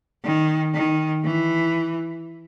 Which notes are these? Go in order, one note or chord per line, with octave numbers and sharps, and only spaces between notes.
D#3
D#3
E3